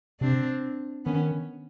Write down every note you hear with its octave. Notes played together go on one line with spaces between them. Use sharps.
C3 C4 D4
D#3 B3 C#4